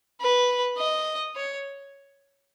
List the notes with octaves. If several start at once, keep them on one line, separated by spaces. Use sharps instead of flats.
B4
D#5
C#5